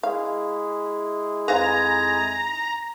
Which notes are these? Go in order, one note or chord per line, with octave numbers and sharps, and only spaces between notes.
G#3 E4 G#4 F5
F2 D#4 B4 C5 F5 G#5 A#5